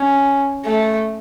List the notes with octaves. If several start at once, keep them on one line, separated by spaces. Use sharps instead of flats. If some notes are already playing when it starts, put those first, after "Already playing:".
Already playing: C#4
A3